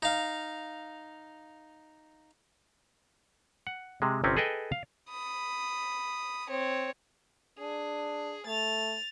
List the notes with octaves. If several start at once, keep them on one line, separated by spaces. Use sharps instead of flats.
D#4 F5
F#5
C3 G#3
G1 C3 C4 C#4
G#4 A4 B4 D#5 G5 G#5
F5
B5 D#6
C4 C#5
D4 G#4
A3 A6 F7